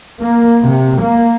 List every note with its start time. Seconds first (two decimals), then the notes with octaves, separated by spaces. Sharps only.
0.22 A#3
0.63 C3
1.02 A#3